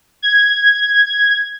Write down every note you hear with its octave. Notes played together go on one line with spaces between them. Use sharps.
G#6